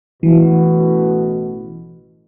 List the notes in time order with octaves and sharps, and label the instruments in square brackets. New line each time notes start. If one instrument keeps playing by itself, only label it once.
[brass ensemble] A1 B2 [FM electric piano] E3